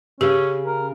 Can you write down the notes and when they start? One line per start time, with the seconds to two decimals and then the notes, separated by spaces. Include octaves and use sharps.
0.21 C#3 C#4 G4
0.66 A#4